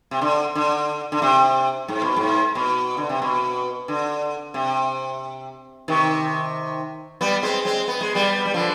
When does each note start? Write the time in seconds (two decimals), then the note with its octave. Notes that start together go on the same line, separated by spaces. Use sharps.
0.11 C3
0.21 D3
0.55 D3
1.12 D3
1.22 C3
1.88 G#2
2.02 B2
2.16 G#2
2.55 B2
2.97 D3
3.09 C3
3.22 B2
3.88 D3
4.54 C3
5.88 C3 D#3
7.21 G3 B3
7.43 G#3 C4
7.65 G#3 C4
7.88 B3
8.01 G#3
8.15 G3 B3
8.45 G3
8.54 D3 F3